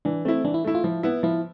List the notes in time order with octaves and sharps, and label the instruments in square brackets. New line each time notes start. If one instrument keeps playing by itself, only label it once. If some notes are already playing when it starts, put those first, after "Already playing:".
[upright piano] E3 [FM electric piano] D4
[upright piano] A3 E4 [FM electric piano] C4
[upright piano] E3 [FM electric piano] D4
[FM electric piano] E4
[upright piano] A3 E4
[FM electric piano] F4
[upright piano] F3 [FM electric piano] E4
[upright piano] B3 E4
[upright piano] F3 [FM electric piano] E4